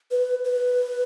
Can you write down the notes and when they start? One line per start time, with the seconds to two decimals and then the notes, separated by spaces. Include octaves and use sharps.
0.11 B4
0.45 B4